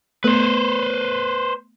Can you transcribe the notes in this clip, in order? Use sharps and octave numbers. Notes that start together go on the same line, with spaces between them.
A3 B3 B4 C5